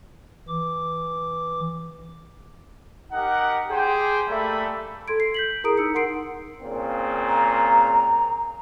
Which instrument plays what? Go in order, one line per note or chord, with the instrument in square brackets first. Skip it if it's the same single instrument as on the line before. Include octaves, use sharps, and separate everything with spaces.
[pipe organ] E3 D6
[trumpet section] D#4 G4 A#4 F#5
G4 G#4 C5 G5
G3 A3 A#3 A4 E5 B5
[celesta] A4 C6 G#6 D7
C7
G6 B6 F#7
E4 G#4 A#4 A#5 D#6 D7
D#4 E6 C#7
A#4 F#5 C6 C7 D7
[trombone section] A#2 C#3 C4
[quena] A#5